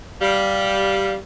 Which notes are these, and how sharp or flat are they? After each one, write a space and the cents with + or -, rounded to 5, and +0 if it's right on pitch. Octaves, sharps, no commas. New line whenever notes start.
G3 -5 F5 +0